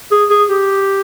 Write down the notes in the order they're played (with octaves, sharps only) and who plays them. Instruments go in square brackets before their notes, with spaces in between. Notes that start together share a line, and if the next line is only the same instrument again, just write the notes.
[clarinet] G#4
G#4
G4